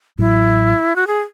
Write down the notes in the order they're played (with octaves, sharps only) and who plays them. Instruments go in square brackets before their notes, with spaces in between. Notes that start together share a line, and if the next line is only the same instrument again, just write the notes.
[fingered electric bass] A1 A2 F#3 [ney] E4
[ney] F#4
G#4